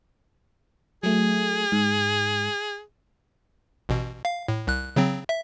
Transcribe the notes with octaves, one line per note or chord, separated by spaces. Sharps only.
F#3 A3 G#4
G#2
A1 B2
F5
A2
C2 F#6
C#3 F#3 C4
E5